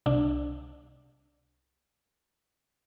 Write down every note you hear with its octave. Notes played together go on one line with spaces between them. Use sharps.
C2 C3 D4